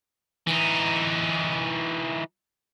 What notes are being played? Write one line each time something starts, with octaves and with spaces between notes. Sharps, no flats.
E3 D#4